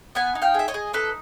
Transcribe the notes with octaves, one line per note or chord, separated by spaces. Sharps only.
B3 F#5 G#5
D#4
F5 G5
G#4 E5
C#5 D#5
G#4
D#4 A4 B4